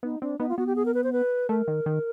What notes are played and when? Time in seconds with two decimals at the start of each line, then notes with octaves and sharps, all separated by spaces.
0.03 B3 D#4
0.21 C4 D4
0.39 B3 D#4
0.49 F4
0.58 B3 F#4
0.67 G4
0.76 G#4
0.85 A#4
0.94 B4
1.04 C5
1.13 B4
1.49 A3 A#4
1.68 D#3
1.86 D#3